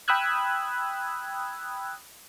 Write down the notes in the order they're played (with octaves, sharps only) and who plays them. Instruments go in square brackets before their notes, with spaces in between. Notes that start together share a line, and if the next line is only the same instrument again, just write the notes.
[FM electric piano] G5 B5 D#6 E6 F#6 G#6